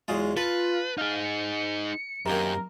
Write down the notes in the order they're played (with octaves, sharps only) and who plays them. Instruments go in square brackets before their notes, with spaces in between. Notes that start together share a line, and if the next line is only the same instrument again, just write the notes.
[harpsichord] E2 F#3 F4 [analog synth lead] G#3
[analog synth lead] F4 [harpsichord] A4 [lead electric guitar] B4
[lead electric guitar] D#4 G#4 [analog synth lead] F5
[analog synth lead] C#7
[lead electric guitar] F#2 [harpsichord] C3 D#3 A#3 [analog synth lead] A#4